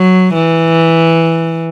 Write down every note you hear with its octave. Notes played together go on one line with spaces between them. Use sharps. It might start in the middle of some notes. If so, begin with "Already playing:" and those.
Already playing: F#3
E3